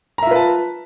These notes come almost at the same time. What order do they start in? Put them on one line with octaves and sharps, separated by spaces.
A#5 E5 F4 B4 A5